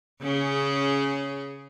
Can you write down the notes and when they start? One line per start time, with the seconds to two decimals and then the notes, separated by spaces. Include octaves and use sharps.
0.21 C#3 C#4 G#4